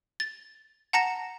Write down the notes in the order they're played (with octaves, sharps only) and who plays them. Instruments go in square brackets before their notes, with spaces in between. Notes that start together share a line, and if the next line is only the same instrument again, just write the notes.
[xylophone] A6
F#5 A5 A#5 A#6 C#7 E7